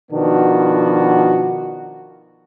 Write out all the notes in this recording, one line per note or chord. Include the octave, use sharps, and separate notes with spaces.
B2 D#3 F3 B3 D4 F#4